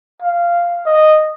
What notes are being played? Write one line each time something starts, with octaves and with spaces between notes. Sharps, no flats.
F5
D#5